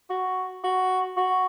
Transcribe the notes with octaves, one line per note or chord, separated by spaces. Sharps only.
F#4
F#4
F#4